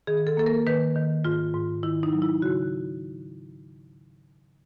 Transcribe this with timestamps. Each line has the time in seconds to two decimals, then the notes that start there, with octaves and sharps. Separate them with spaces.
0.07 D#3 G#4
0.27 A4
0.37 A#3 A4
0.46 A#4
0.66 D#3 B4
0.96 D#3
1.25 G#2 F4
1.54 G#2
1.83 D#3 E4
2.03 D#4
2.13 F#3
2.22 E4
2.42 C#3 F#4